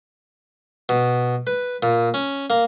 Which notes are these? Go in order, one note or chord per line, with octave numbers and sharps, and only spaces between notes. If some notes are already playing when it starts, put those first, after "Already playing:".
B2
B4
A#2
C#4
A#3